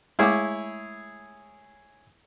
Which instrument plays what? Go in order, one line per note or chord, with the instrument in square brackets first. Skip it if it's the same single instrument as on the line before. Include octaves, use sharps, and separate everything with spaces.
[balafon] G#3 A3 D6 [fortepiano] E4 G#4 C#5